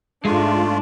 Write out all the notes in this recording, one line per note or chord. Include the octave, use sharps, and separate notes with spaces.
G#2 G#3 A3 D4 F4